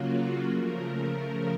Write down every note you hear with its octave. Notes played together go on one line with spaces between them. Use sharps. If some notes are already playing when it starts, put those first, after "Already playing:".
Already playing: C#3 F#3 A#3 F4 F#4
C#3 F3 A3 A#4